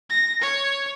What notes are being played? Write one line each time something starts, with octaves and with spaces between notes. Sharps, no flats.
A#6
C#5